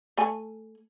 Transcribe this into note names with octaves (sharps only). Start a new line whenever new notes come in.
A3 G#5